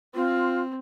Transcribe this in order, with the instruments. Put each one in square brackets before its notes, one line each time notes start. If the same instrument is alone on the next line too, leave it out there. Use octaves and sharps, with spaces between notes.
[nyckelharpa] C4 [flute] F4